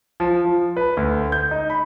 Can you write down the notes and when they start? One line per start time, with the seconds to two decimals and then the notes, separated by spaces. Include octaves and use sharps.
0.20 F3
0.45 F3
0.77 B4
0.97 D2
1.32 G6
1.51 D#4
1.70 B5